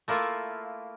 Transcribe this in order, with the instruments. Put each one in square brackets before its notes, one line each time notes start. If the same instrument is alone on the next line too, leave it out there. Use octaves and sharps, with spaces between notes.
[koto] A3 A#3 E4 F4